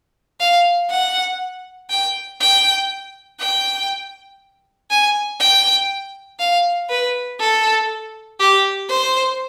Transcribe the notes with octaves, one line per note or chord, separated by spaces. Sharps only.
F5
F#5
G5
G5
G5
G#5
G5
F5
B4
A4
G4
C5